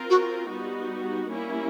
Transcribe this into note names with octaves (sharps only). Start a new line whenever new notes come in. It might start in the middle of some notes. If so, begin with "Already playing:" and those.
Already playing: C4 F4 A#4
F#4
G3 B3 D#4 F#4
G3 A#3 C#4 E4